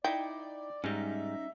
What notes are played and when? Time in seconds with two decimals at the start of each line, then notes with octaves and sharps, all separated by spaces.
0.04 D#4 E4 D5 G5
0.84 G#2 G3 C#4 D#4 D#5 E5